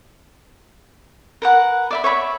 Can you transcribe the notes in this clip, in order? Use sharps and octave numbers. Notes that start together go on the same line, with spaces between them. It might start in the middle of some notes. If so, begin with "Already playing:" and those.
A#4 B4 F#5
D5 E5 B5
C#5 E5 B5